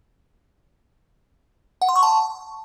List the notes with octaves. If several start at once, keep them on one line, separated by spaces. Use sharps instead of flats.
F#5
C6
C#6
A5